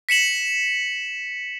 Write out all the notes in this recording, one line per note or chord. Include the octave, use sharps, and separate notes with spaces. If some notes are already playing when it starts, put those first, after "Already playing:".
B6 C#7 E7 F#7